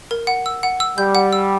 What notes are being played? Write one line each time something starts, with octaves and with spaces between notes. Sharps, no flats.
A#4
F#5
E6
F#5
E6
G3 G6
F#5
E6